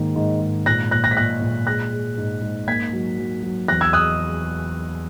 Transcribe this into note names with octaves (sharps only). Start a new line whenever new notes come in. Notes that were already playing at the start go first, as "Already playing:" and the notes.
Already playing: G#2 D#3 A#3
G#2
G#2
A#2 F#6 A#6
A#2 F#6 A#6
F#6 A#6
B6
A#2 F#6 A#6
A#2
G#3 F#6 A#6
G#3
G#2
G#2
A#3 G#6 B6
F#3
F#3
F#3
E2 F#6 A#6
E6 G#6
D#6 F#6